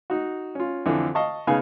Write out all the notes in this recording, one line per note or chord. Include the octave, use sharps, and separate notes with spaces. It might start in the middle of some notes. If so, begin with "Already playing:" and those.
D#4 F#4
C#4 F4
F2 D3 E3
D#5 F5 A5 C#6
C#3 B3 D#4 F5 G#5